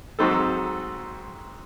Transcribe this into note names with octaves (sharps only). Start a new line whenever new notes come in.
G#2 F#3 C4 D#4 A4